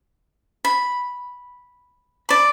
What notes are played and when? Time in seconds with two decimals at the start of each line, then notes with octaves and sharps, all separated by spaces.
0.65 B5
2.29 D5 B5